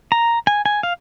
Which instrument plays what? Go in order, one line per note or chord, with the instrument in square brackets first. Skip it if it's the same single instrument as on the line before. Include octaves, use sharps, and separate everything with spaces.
[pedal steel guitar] A#5
G#5
G#5
F5